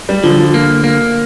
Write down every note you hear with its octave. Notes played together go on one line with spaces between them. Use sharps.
G3
D3 F3
F3
A#3
A#3